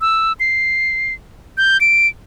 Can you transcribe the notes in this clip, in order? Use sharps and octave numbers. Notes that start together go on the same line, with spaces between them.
E6
C7
G6
D7